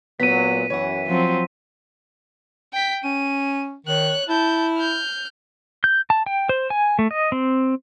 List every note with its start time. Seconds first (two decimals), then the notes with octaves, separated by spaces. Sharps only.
0.20 A#2 F#3 B3 B6 D#7
0.70 F#2 E3 C#5 F#5
1.07 F3 F#3 C4
2.73 G5 B6
3.04 C#4 D#7
3.86 D#3 C#5 F#6
4.29 E4 A5 G6
4.78 F6 G6
5.84 G6
6.10 A5
6.26 G5
6.49 C5
6.70 G#5
6.99 A3
7.11 D#5
7.32 C4